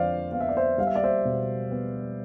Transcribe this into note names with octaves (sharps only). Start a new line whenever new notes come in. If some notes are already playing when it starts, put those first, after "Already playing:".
Already playing: F2 D3 F3 C5 D5 F5
B3 F5
E5
D5
C5 E5
G3 F5
E5
D5
C5 E5
B2
B3